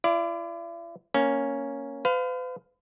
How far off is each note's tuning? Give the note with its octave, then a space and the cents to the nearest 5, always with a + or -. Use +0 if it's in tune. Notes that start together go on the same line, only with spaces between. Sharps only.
E4 +45 D5 +0
A#3 +0 C#4 +0
B4 +45 F5 +5